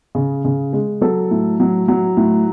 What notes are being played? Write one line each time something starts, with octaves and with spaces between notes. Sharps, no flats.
C#3
C#3
G#3
F#3 A4
A2
F#3
F#3
A2